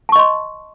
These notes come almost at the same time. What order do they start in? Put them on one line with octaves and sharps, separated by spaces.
A5 C#6 D#5 C6